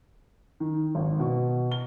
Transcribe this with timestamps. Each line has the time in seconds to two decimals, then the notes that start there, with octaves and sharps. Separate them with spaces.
0.60 D#3
0.95 G#1
1.20 B2
1.72 G7